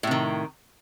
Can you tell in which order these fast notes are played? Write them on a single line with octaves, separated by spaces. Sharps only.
A2 C3 D#3